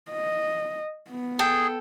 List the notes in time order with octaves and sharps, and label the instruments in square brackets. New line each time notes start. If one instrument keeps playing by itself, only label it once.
[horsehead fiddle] D#5
B3
[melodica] G#4 [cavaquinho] A4 G5